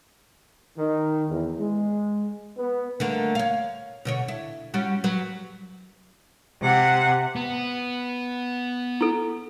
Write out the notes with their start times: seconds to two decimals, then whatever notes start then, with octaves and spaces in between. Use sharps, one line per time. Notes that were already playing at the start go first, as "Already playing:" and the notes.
0.77 D#3
1.30 E2
1.59 G#3
2.57 B3
3.00 D3 A3 A#3
3.35 C#5 F5
4.05 B2 D3 C#5
4.28 E4
4.74 G3 C#4 F#4
5.04 F#3 B4
6.62 C3 F#5
7.36 B3
9.01 E4 A4